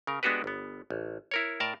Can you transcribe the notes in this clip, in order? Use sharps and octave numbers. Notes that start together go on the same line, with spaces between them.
C#3 A#4
G#3 B3 D4 F#4 G4 B4
G1 B3
A1
E4 A#4 C#5
A2 A#4 D5 A5